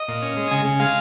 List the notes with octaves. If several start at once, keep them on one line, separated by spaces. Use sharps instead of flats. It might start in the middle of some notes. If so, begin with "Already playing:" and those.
Already playing: D#5
A#2
C#4
G#3
C#3 G#5
C#3
G#3 F5